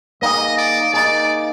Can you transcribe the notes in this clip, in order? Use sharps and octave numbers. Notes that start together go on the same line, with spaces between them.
A#3 D#4 G#4 D#5
D5
A#3 D#4 G#4 D5